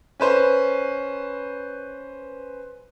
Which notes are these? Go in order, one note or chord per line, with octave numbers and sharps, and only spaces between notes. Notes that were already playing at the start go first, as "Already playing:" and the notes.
C#4 B4 C5 B5